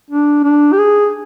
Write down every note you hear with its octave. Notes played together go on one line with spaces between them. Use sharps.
D4
D4
G4
G#4